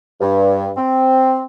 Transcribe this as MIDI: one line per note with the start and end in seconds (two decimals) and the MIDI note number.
0.21 0.70 43
0.77 1.43 60